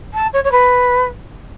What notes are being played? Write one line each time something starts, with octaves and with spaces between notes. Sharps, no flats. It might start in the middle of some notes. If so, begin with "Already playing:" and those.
A5
C#5
C#5
B4